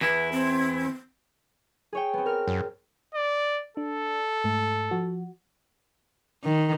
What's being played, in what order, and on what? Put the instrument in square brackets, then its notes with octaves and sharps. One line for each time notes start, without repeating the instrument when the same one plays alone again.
[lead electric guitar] E2 E4 [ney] B4
[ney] C4
[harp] G#4 C#5 G5
B3 C4
A#4 F6
[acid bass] F#2
[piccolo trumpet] D5
[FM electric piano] D4 [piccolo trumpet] A4
[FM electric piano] G#2 A3
F3 F#4
[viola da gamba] D#3